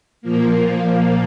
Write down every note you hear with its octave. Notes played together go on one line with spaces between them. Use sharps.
A#2 F3 A#3